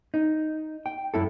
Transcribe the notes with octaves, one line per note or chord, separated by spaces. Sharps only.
D#4
G5
F#2 E4 A4